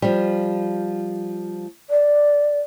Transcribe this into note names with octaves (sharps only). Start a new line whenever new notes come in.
F3 G3
D5